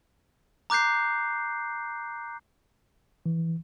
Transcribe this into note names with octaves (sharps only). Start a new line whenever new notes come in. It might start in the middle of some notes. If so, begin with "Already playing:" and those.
A#5 D6 F#6 G6 C7
E3